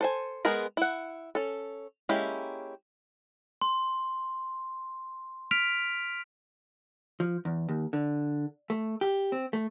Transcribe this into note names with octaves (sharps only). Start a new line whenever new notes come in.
A4 C5 G#5
G#3 B3 G#4 A#4
E4 F#5
C#4 A4
G#3 A#3 C#4 E4 G4
C6
F6 B6 D7 F7
F3
E2
D#2
D3
A3
G4
C4
A3